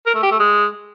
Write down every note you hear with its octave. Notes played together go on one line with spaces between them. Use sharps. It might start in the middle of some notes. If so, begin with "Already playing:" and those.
A#4
A3
G4
A3
G#3